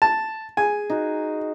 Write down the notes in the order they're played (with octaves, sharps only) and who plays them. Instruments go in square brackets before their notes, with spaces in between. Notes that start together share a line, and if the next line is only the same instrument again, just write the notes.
[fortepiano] A5
[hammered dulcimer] G#4 [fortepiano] G#5
[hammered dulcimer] D#4 F#4